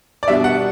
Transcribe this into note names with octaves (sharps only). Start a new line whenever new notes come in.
D5
B2 G3 D4 E5
F#5